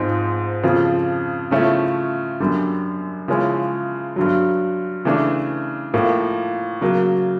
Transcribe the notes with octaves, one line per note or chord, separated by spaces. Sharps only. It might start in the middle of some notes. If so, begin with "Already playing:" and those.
Already playing: G#2 F3 G#3 C4 D#4
F2 C#3 F3
C#3 F3 A3 C#4 E4
F#2 D3 G3
C#3 F3 G#3 C#4 E4
G2 D3 F#3
C#3 E3 A3 D4
A2 F3 A#3
C#3 F#3 A#3